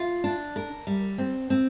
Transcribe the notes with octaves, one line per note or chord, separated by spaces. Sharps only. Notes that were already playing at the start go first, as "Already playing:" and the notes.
Already playing: F4
D4
A#4
G3
C4
C4